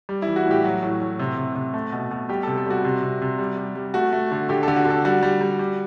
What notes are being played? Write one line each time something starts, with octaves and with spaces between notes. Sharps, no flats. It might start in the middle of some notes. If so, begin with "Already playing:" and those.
G3
E3 E4
F#4
A2 G4
F#3 F#4
A2
A2
C3
C3
C3
A3
B2
B2
G3 G4
C3 A4
A4
G3 F#4
C3
C3
C3
G3
G3
G3
A3 F#4
A3
D3
D3 G4
D3 A4
F#4
D3 A4
G3 F#4
G3
G3
G3